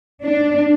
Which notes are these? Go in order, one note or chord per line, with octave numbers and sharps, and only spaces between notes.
D4